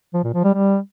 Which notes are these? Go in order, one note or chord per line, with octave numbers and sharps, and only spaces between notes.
F3
A#2
F3
G3
G3